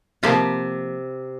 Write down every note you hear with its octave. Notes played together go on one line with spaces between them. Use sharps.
C3 F3 A#3 F4